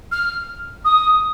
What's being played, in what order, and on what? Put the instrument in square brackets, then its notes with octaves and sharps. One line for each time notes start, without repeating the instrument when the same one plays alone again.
[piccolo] F6
D#6